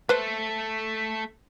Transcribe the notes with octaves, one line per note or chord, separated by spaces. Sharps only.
A3 A4 B4 C5